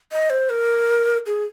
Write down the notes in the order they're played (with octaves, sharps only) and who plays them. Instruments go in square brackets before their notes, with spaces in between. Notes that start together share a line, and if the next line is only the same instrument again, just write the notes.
[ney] D#5
C5
A#4
G#4